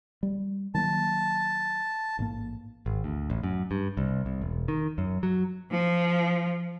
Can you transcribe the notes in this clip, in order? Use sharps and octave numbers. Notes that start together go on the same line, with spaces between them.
G3
D#3 F#3 A#3 A5
A1 G#2 A#3
G#1
D2
A1
F#2
G2
C2
C2
E1
D#3
F#2
F#3
F3